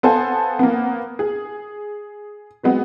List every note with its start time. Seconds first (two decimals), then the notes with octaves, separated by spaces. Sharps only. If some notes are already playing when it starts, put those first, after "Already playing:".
0.03 B3 A4 C5 F5 G#5
0.59 A#3 B3
1.19 G#4
2.63 F#3 G#3 B3 C4